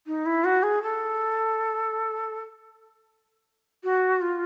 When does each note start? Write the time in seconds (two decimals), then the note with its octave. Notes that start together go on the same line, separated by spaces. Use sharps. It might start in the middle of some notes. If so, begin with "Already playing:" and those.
0.07 D#4
0.26 E4
0.44 F#4
0.63 G#4
0.82 A4
3.84 F#4
4.21 F4